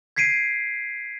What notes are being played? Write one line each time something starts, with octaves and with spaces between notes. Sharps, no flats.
G#6 B6 C7 D7 D#7